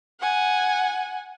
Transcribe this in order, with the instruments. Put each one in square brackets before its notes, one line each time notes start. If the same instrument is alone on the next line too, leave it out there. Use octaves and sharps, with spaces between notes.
[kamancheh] F#5 G#5